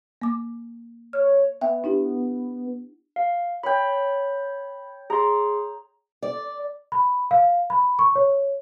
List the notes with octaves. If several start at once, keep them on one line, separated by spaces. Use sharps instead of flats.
A#3 D6
C#5 F6
B3 E5 G5
D4 E4 G4
F5
C#5 G5 B5
G#4 A#5 C6
D5
B5
F5
B5
C#6
C#5